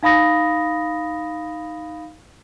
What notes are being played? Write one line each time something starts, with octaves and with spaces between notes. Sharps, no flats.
D#4 F5 B5 D#6 A#6